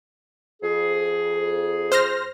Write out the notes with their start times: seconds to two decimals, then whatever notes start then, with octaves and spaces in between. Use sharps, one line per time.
0.62 F2 G#4
1.92 C5 F6 A#6